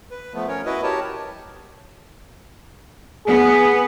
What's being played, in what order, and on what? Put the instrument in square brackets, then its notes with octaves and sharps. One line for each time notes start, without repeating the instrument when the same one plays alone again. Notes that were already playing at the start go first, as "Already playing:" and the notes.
[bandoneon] B4
F3 A3 B3
C#4 A#4 C#5
E4 F#4 B4 D#5
G4 A#4 C#5 A5
[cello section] B3 [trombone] G#4